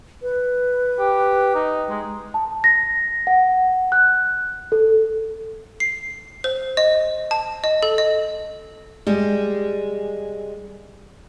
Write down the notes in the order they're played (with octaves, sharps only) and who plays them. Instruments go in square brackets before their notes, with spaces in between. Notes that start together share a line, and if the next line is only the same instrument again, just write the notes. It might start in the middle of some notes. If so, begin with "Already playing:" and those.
[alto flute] B4
[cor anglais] G4
D#4
G#3
[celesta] A5
A#6
F#5
F#6
A4
[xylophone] C7
C5
D#5
A5
D#5
A4
D#5
[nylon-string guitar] G3 G#3